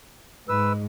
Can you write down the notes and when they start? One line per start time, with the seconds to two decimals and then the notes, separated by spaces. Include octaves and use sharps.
0.49 G#2 B4 E6